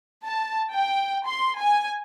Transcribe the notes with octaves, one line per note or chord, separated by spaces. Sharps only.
A5
G5
C6
G#5